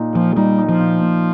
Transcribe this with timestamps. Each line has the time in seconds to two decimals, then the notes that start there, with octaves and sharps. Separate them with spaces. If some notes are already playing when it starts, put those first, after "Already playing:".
Already playing: A#2 D#4
0.15 A#2 F3
0.37 G3 D#4
0.59 D#4
0.69 F3
0.79 A#2
1.01 A#2